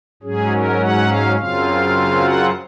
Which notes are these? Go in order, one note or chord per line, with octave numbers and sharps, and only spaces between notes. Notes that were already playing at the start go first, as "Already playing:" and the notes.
G#2 F#3 C#4 G#4
A#4
F#5
F5
F#2 C#3 F#3 C4 F4 F5
F#5